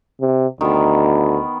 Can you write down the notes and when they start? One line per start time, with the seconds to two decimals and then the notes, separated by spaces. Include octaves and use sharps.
0.22 C3
0.61 D2 D#3 B3